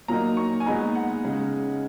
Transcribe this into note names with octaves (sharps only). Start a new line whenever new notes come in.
A#2 F#3 A#3 D#4 A#5
C#6
G#5
A#2 G#3 B3 D#4 A#5
F#5
C#3 G#3 D#4